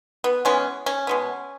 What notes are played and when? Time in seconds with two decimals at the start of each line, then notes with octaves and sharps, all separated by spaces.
0.24 B3
0.45 E3 G#3 B3 C#4
0.86 C#4
1.07 B2 G#3 B3